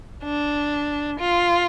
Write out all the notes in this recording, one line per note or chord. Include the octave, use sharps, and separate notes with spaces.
D4
F4